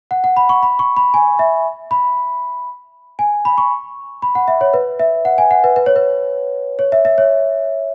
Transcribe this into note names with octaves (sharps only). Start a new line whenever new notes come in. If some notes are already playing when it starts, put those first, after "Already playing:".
F#5
F#5
B5
C#6
B5
C#6
B5
G#5
E5
B5
G#5
B5
C#6
B5
F#5
E5
C#5
B4
E5
F#5
G#5
F#5
B4
B4
C#5
B4
C#5
E5
E5
C#5